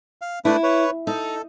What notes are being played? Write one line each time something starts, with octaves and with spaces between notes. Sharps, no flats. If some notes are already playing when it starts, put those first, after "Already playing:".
F5
A3 D4 E4 B4
B4 C#5
D#4 A4